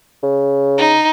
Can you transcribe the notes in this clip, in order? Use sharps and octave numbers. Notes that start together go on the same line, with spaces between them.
C#3
D#4